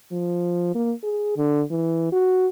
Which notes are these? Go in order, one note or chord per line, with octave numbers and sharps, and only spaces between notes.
F3
A#3
G#4
D3
E3
F#4